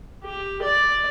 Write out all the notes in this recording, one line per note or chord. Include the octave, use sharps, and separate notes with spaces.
G4
D5